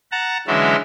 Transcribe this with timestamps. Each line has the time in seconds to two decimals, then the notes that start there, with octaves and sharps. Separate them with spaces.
0.12 F#5 A5 A#5
0.47 D3 E3 F#3 G#3 C#4 E5